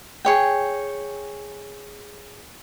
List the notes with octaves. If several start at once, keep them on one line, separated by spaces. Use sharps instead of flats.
G#4 C#5 G5